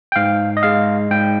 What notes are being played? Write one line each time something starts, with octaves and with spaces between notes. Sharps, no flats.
G5
G#2 F5
D#5
G#3 F5
G#2 G5